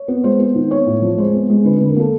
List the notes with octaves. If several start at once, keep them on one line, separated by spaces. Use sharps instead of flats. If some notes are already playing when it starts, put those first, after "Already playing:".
Already playing: C#5
B3
G#3 C5
B3
D#3
B3 C#5
A2
F3
G#3 C5
B3
G#3
D3 B4
D3 B4
A#4
A#3 A4